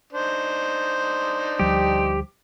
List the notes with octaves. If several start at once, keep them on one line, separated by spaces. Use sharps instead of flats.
D4 D#4 C5
D2 F3 G3 G4